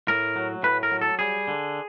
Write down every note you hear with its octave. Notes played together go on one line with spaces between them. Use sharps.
A2 A#4
F#3
A2 B4
A#4
F#3
A4
G3 G#4
D3